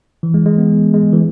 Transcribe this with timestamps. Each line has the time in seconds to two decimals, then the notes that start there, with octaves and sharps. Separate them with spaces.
0.23 E3
0.34 G#3
0.46 G#3
0.58 B3
0.94 G#3
1.13 E3